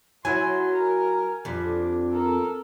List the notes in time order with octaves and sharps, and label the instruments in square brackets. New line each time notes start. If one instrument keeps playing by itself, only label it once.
[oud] F#3 E4 [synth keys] G#5 [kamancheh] C6
[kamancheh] A#4
[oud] F2 G3 [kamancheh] D4
[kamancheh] A4 A#4